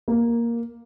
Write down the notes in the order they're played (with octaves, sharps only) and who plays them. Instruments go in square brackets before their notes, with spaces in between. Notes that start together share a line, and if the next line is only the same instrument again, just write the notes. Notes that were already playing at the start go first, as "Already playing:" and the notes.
[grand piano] A#3